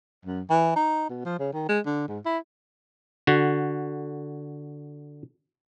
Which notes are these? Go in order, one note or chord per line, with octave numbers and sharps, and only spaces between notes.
F#2
E3
D#4
B2
F3
C#3
D#3
G#3
D3
G#2
E4
D3 F#4